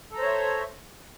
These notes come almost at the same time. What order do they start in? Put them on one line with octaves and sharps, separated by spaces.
A4 A#5 C5 C#5 E5